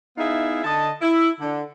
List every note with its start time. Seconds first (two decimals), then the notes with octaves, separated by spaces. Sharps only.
0.17 B3 D#4 E4 G#4 E5 F5
0.64 D3 D#5 A5
1.02 E4
1.40 D3